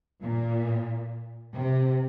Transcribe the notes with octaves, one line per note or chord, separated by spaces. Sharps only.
A#2
C3